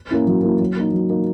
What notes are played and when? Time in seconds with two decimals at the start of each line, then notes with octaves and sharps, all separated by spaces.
0.11 A#3 C#4 E4
0.27 F#3
0.43 A#3 C#4 E4
0.60 F#3
0.76 A#3 D#4
0.93 F#3
1.10 A#3 D#4